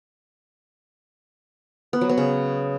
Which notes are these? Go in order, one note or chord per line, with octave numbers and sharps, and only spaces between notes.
B3
F#3
B3
C#3